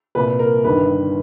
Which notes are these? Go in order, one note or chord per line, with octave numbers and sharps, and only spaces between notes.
C2 A#2 B4
A#4
G1 G2 D#3 B4